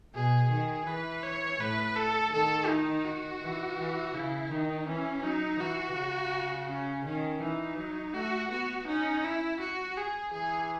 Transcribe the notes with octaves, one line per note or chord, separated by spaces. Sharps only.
B2 G#4
D#3 G#4
E3 B4
C#5
A2 B4
A4
D#3 A4
D#4
F#4
E3
E3
C#3 E4
D#3 D#4
E3 C#4
F#3 D#4
E3 F#4
C#3
C#4
D#3 C#4
E3 D#4
F#3
A3 F#4
B3 F#4
C#4 D#4
E4
F#4
G#4
E3 G#4